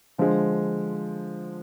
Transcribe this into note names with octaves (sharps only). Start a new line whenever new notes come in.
D3 F3 G#3